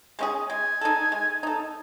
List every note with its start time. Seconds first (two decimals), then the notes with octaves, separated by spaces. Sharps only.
0.19 G#3 C#4 G#4
0.50 G#3 G#5
0.81 D#4 A4
1.12 G#3
1.43 D#4 A4